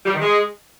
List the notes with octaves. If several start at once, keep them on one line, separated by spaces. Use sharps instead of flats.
G3
D#3
G#3